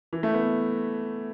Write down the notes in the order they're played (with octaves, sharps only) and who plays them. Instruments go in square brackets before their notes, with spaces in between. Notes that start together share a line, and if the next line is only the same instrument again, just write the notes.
[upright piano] E3
A3
B3